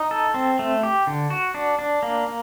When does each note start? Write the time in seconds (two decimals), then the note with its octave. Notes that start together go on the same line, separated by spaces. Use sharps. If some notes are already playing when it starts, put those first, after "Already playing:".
Already playing: D#4
0.11 A4
0.34 C4
0.59 A3
0.83 G4
1.07 D3
1.30 F#4
1.54 D4
1.79 D4
2.03 A#3